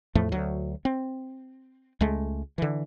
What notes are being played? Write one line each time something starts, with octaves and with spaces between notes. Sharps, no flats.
E2 A2 F3 A3
D2 F#3
C4
C#2 G#3 A3
D3 E3